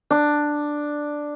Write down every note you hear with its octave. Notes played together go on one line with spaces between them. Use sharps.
D4